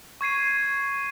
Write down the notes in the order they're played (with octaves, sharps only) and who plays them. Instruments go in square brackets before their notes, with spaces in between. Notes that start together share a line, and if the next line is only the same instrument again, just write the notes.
[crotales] C#6 G#6 C7 D#7